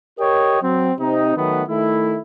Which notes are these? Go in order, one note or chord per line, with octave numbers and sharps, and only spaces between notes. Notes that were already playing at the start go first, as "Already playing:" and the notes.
G4 A#4 C#5 D#5 G5
F#3 C4
C3 C4 D#4
D#3 F#3 A3 B3
D#3 A3 E4